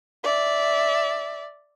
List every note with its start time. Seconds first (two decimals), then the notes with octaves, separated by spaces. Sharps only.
0.24 D5 E5